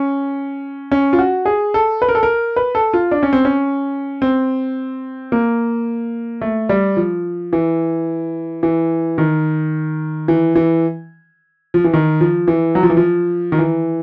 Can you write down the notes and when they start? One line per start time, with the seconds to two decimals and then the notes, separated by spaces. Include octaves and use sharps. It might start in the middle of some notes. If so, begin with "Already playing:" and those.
Already playing: C#4
0.92 C#4
1.13 F4
1.19 F#4
1.46 G#4
1.74 A4
2.02 B4
2.09 A#4
2.15 A4
2.23 A#4
2.56 B4
2.75 A4
2.94 F4
3.11 D4
3.23 C#4
3.33 C4
3.45 C#4
4.22 C4
5.32 A#3
6.41 A3
6.69 G3
6.97 F3
7.53 E3
8.63 E3
9.18 D#3
10.28 E3
10.55 E3
11.74 F3
11.84 E3
11.93 D#3
12.21 F3
12.48 E3
12.75 F#3
12.83 F3
12.90 E3
12.97 F3
13.52 D#3
13.58 E3